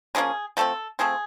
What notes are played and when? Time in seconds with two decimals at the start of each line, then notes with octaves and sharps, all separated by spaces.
0.15 D3 F3 A#3 C#4 G#4
0.57 F3 A3 C4 A4
0.99 F3 A3 C4 G#4